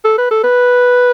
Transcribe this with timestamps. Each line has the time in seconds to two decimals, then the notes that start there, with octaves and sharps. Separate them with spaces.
0.05 A4
0.18 B4
0.31 A4
0.43 B4